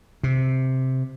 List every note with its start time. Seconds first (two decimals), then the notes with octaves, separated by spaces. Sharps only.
0.24 C3